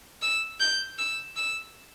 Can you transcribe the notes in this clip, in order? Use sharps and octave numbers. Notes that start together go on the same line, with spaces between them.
E6
G6
E6
E6